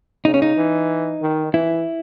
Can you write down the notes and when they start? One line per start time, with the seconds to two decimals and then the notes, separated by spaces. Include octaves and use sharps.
0.25 C#3 D#4
0.34 C#4
0.42 D#4
0.56 E3
1.22 D#3
1.53 E3 E4